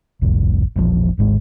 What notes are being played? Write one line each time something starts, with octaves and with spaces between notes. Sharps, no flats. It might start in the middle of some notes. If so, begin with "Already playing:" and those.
G1 C2 F2 A2
E1 A#1 F3
D1 G#1 G#2 G#3